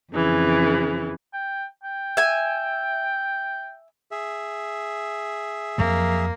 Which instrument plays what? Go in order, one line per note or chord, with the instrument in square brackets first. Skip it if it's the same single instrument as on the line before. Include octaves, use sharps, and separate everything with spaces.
[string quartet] F2 C#3 E3
[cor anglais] G5
G5
[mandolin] E5 G#5
[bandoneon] G#4 E5
[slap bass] F2 F3 F#3 [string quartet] A#3